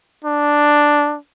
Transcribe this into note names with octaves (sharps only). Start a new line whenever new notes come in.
D4